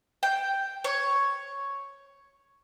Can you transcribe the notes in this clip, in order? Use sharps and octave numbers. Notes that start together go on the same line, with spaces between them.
G5
C#5